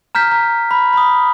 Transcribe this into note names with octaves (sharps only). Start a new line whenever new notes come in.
A#5 F6 G6 B6
A#5
B5
B5 D#6